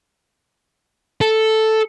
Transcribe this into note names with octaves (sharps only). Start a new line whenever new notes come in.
A4